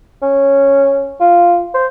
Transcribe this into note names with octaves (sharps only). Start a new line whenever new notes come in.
C#4
F4
C5